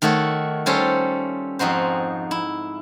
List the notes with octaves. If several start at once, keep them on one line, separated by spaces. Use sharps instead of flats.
D#3 A3 F#4 A4 C#5
G3 C#4 F4 A4 C5 C#5
F2 G#2 D#4 F#4 C5
E4